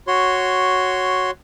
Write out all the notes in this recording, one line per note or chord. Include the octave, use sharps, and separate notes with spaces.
F#4 C#5 C6